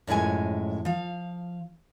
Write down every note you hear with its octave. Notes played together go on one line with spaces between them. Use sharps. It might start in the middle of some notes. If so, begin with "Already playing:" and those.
F#2 A2 F3 G#3 G#5
F3 F5